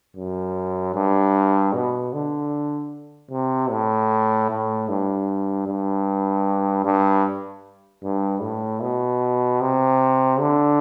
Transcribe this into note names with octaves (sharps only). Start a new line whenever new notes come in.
F#2
G2
B2
D3
C3
A2
A2
G2
G2
G2
G2
A2
B2
C3
D3